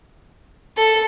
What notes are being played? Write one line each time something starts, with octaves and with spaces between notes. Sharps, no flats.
A4